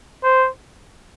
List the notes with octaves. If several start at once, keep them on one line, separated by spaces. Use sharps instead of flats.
C5